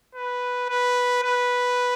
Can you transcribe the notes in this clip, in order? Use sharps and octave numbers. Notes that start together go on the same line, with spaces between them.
B4
B4
B4